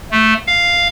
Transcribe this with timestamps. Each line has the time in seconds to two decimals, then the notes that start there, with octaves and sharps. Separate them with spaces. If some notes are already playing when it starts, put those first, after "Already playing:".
0.11 A3
0.47 F5